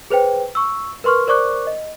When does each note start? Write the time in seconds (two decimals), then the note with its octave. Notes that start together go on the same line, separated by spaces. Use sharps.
0.10 G#4 B4 C5 G5
0.55 C#6 E6
1.04 A#4 B4 C6 C#6 F6
1.27 A#4 C5 D5 C#6 D6 F#6
1.67 D#5